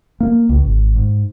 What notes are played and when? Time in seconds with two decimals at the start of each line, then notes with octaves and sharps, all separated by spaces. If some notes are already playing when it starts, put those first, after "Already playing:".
0.20 A#3
0.49 C#2
0.64 G#1
0.96 G#2